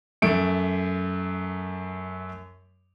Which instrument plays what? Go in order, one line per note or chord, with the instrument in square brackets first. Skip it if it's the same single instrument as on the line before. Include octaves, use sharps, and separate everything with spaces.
[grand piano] F#2 A3 D7